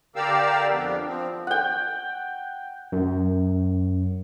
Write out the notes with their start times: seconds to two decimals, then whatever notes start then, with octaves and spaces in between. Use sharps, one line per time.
0.16 D3 G4 A#4 D5 F5 E6
0.69 F2 B3 D4
1.05 F3 C4
1.47 F#5 G5
2.92 F#2